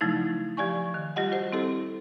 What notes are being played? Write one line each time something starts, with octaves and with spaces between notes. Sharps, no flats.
C#3 F3 F#3 A3 D#4 E4
F3 G4 D5 G#5 C#6
D#3
G3 F4 G4 D#5 F#5
F#4 G4 C5
C4 E4 G4 A4